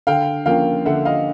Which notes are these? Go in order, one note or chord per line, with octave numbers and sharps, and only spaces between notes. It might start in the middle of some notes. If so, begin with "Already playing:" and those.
D3 F5 G5
F3 A#3 C#4 F5 G5
D3 E5 F#5
D#5 F5